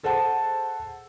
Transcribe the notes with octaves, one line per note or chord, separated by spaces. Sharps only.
G#4 A4 C5 F#5 A5